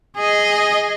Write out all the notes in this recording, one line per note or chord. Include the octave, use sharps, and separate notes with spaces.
G#4 D#5